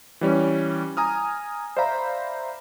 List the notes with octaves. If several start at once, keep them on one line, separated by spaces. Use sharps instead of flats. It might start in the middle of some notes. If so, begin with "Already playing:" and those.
E3 G3 C#4
G#5 A#5 D#6 F6
C5 D5 E5 F5 A#5 B5